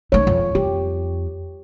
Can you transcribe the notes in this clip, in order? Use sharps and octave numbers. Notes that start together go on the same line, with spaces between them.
A3 D#4 C#5
F2
F2 G4